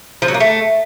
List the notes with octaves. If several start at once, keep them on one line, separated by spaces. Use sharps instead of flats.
F3
F#3
A#3
A3